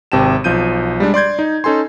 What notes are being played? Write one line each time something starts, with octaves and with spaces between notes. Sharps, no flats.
G#1 C3 G5 A5 E7
B1 F3 G6 D#7
G3 G#3 D4
D5 C6 G6 G#6
D#4
C#4 D#4 A4 G#5 C6